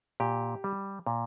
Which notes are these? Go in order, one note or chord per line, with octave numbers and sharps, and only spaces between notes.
A#2 G4
G3
A#2